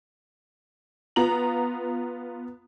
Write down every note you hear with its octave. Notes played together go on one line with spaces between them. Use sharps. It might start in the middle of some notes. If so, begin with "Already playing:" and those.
B3 F4 A#5 F#7